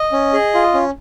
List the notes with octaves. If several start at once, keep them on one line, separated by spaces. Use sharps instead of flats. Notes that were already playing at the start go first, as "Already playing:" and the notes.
Already playing: D#5
C#4
G#4
F4
C#4